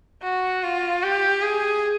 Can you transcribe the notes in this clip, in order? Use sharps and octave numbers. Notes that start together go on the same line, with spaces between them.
F#4
F4
G4
G#4